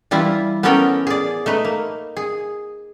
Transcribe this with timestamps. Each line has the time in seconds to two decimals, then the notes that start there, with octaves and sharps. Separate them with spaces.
0.11 E3 G3 E4 F4
0.63 B3 C#4 G4 A4 A#4 G5
1.07 G#4 D5
1.46 A3 D#4 B4
1.65 A#3
2.17 G#4